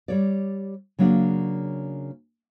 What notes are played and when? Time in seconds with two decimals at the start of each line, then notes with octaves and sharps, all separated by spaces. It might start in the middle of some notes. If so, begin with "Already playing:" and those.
0.08 G3 C#5 D5
0.99 C#3 F#3 A#3 D4